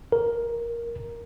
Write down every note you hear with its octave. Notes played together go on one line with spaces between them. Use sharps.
A#4